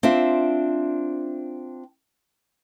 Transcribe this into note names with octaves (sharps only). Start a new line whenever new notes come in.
C4 D4 F4 E5